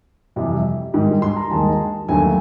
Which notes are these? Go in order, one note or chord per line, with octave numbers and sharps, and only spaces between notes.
F2 C3 E3 G3
G#2 D#3 G3
C6
A#5
D#2 D#3 G#3 A5
D#2 D3 F#3 A3 G#5